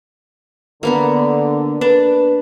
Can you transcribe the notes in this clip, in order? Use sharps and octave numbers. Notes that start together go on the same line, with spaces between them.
D3 A#3 B3 A#4
D4 B4